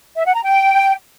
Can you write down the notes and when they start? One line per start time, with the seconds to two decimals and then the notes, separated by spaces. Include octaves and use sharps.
0.16 E5
0.25 F#5
0.35 A#5
0.44 G5